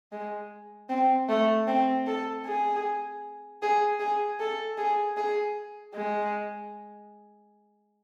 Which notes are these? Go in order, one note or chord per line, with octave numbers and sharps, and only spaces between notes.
G#3
C4
A3
C4
A4
G#4
G#4
G#4
A4
G#4
G#4
G#3